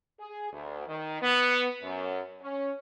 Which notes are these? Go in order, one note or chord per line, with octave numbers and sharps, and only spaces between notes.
G#4
D2
D#3
B3
F#2
C#4